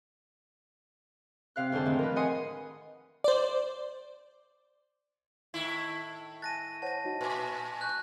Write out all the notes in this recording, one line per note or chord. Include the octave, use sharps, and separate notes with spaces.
C3 F5 F#6
F2 G#2 D3 C5 A5
A2 D#3 F3
A#4 B4
D#5 F#5 G#5 C6 D#6
C5 D5
A2 D#3 E4
G#5 A5 F#6 A6 A#6 D#7
C5 C#5 F#5 A5 A#6
D#4 F#4 D#5
A#2 B4 G#5 D6
G#5 C#6 F#6 G6